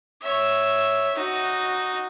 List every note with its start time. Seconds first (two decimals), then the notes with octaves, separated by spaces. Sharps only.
0.22 C#5 E5
1.15 D#4 F#4